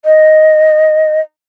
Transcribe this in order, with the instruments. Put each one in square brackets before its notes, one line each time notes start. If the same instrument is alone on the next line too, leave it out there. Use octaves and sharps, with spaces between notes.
[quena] D#5